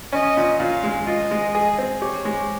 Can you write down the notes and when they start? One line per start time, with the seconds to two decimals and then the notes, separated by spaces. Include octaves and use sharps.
0.12 C#4 D#5
0.37 A#2
0.60 A#2 F5
0.84 G#3
1.07 F4 D#5
1.31 G#3
1.55 G#4
1.78 C4
2.02 G4 C#5
2.25 G#3